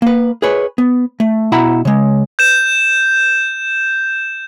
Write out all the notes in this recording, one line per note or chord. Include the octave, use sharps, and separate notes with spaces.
A#3 B4
G#4 B4 C#5
B3
A3
B2 E4 F#5 A#5 B5
C#3 G#3
G6 E7